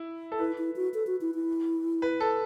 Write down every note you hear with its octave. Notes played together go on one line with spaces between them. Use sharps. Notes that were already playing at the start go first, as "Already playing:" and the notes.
Already playing: E4
A4
E4 B4
E4
F#4
A4
F#4
E4
E4
B4
A4